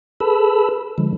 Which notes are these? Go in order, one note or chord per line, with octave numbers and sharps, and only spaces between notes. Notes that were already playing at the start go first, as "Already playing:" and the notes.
G#4 A4 B4 A5 B5 E6
D3 F3 G#3